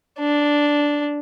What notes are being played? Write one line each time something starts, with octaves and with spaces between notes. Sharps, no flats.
D4